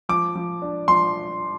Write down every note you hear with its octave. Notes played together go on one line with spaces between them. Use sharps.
F3 D6
F3
D4
F3 C6